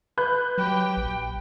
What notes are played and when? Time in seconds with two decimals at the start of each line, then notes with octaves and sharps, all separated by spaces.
0.17 B4 F#6 G6
0.58 F#3 G4 G5
0.97 A#1